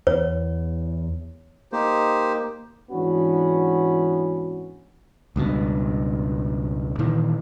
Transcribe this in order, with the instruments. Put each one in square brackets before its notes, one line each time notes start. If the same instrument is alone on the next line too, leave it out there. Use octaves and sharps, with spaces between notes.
[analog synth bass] E2 [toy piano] C#5
[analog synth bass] A#3 [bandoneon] D#4 G4 C5
[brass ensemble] G#2 E3 B3 C#4 D4 F#4
[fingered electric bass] C#2 G2 B2
A#2 D#3 E3